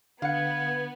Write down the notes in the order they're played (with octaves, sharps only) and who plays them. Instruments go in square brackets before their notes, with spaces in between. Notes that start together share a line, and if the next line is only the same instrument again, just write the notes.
[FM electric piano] D3 C#7 [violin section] B3 [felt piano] F5 F#5 [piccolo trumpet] G#6